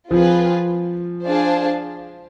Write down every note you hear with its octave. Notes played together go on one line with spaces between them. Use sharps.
F3 C4 F4 G#4 B4
D4 G#4 C5 F5 A5